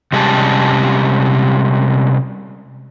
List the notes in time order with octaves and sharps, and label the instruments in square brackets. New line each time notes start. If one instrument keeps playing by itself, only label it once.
[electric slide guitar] C3 G3 G#3 C#4 G4 A5